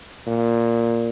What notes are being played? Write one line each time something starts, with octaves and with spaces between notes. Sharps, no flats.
A#2